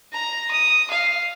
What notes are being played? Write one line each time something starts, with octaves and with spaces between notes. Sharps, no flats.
A#5
D#6
F5